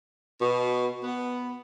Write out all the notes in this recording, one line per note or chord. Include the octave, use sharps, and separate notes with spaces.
B2
B3